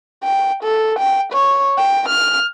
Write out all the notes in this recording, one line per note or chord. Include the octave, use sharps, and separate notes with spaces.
G5
A4
G5
C#5
G5
F6